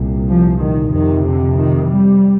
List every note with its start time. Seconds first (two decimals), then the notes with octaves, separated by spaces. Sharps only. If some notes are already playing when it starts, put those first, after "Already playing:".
Already playing: C2 A#2
0.28 F3
0.60 D#3
0.92 F2 C3 D#3
1.23 D3
1.56 D#3
1.87 G3